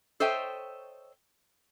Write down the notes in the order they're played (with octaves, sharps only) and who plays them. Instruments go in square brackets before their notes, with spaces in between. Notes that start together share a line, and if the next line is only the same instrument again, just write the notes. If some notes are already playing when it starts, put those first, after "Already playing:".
[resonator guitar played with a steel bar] A4 C5 C#5 D#5 E5 G5